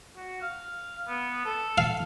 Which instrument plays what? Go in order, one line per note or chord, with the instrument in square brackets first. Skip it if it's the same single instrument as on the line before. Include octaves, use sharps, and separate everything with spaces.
[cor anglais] F#4
F5
B3
A4
[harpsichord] F5